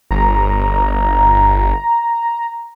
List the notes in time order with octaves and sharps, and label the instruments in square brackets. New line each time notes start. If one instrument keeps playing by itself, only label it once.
[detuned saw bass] G1 [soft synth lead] A#5